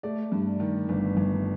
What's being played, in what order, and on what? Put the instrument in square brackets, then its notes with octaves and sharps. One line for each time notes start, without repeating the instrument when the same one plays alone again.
[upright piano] A3 D5
G2
D#3
G1
G1